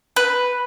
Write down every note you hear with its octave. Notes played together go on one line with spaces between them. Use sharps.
B4